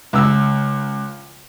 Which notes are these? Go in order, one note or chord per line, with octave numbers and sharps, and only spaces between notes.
C#2 E6